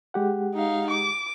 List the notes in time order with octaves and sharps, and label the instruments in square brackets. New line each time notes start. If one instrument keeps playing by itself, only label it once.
[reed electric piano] G#3 G4 F#5
[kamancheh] D#4 F5
D6